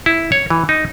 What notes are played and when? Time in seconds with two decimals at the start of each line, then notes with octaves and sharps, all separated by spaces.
0.06 E4
0.32 C#5
0.50 E3
0.69 D#4